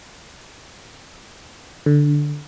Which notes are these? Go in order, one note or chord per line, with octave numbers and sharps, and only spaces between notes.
D3